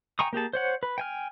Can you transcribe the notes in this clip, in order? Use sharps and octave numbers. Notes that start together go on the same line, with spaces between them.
G5 G#5 A#5 C#6 D#6
A#3 G4 G#4 A5
C5 C#5 F#5
B4
G5 G#5 F6